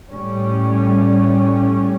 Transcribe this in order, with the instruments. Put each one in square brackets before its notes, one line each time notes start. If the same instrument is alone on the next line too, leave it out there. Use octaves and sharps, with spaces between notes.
[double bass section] A2 G3 C#4